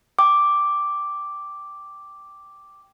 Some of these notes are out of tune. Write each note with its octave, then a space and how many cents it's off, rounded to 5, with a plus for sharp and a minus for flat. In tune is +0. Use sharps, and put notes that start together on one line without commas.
G5 +0 D6 +0